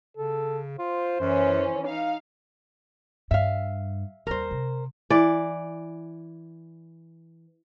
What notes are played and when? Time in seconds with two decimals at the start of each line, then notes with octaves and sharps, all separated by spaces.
0.17 C#3 A4
0.79 F4 C5
1.20 F#2 E3 C#4
1.87 D#4 F5
3.31 G2 E5 F5
4.27 D#2 G3 A#4 C5
4.51 C3
5.10 E3 D5